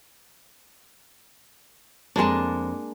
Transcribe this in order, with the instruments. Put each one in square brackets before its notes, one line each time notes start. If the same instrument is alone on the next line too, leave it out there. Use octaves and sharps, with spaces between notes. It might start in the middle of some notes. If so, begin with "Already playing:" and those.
[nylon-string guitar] F2 G#5 A5 [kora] G#3 A#3 D4